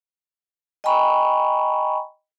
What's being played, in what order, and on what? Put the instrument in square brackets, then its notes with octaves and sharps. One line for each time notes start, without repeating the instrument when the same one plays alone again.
[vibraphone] D#5 G5 G#5 A#5 B5 C#6